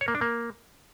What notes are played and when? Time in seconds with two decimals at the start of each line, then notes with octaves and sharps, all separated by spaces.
0.01 C#5
0.08 A#3
0.15 D4
0.21 A#3